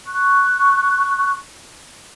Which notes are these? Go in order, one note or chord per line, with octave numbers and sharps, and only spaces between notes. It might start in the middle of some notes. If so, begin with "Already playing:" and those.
C#6 F#6